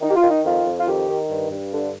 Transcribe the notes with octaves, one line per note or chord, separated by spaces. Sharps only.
D#3 D#4
G4
F4
D#3
D#4
F2 F4
F2
F4
D#3 G4
D#3
G2
G2
D3